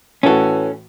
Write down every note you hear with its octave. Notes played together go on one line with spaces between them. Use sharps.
A2 E3 C#4 F#4 A4